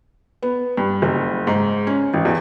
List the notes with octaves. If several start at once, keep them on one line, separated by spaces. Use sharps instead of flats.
B3
G2
F#1
G#2
C#4
A1
E2